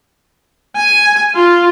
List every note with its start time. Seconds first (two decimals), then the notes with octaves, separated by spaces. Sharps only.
0.76 G#5
1.35 F4